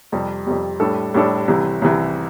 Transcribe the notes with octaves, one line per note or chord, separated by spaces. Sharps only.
F2 C3 G3
F2 C3 G3
A2 G3 D4 A4
A2 G3 D4 A4
C2 C3 E3
C2 C3 E3